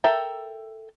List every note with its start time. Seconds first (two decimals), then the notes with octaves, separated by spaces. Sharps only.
0.04 A4 A#4 E5 G5